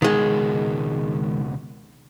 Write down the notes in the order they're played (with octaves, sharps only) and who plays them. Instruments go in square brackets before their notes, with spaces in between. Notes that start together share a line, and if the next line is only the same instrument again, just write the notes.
[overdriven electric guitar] C#2 B2 [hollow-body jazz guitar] D#3 G#3